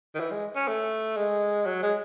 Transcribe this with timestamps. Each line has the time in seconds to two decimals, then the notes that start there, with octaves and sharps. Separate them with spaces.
0.15 D#3
0.20 E3
0.31 G#3
0.56 C#4
0.68 A3
1.17 G#3
1.66 F#3
1.82 G#3